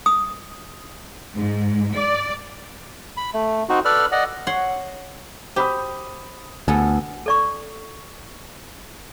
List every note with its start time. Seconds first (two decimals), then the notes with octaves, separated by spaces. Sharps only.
0.06 D#6
1.36 G#2
1.94 D5
3.17 B5
3.34 A3
3.69 C4 D#4 F#4
3.85 A4 B4 D5 B5 F6
4.12 D5 D#5 F#5
4.47 C#5 F#5 C6
5.56 G4 C5 B5 D#6
6.68 D2 B3 A4 G#5
7.26 A4 D5 C#6